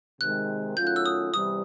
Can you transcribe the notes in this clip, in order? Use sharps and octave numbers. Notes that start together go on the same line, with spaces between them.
C3 D#3 G#3 F#6
D#3 F#3 A3 C#4 F4 G6
F#6
E6
D#6
E2 C3 E3 G3 D#6